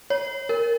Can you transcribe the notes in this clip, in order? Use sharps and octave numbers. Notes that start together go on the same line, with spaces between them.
C#5
A#4